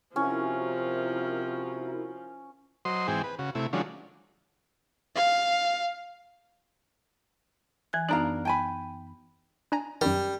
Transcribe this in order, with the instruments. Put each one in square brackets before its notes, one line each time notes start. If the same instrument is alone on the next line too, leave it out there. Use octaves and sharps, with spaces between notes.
[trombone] C3 [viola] F3 [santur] C#4 [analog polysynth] E4 F#4 A#4
[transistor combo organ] F#3 C5 D#5 C6
G#2 E3 C4 G#4 G5
B4
C#3 F#4
C3 A3 E4
D#3 F3 F#3 G#3 C#4 D4
[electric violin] F5
[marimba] E3 G#5 F#6
[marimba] F#2 B3 D#4 [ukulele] D4 A#4 F5
[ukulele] G5 G#5 B5
[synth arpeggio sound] D4 G#5 A#5
[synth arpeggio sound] F#2 D#3 [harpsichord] G3